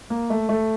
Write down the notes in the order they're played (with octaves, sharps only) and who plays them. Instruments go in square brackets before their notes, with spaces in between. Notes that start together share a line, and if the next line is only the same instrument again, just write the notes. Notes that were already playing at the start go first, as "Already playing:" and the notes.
[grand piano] A#3
A3
A3